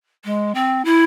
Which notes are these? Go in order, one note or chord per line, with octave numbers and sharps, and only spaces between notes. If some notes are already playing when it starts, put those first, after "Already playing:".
G#3
C4
E4